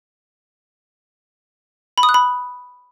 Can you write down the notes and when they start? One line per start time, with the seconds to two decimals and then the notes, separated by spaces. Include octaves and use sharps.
1.98 B5
2.03 D#6
2.09 F#6
2.14 B5